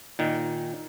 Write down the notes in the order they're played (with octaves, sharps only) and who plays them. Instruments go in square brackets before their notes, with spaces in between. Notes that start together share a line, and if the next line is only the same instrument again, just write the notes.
[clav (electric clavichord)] A#2 D#3